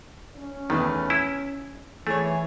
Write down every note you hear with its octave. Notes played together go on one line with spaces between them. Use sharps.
C#4
E2 D#3 A3 B4
E4 E6
E3 A3 G#4 C#5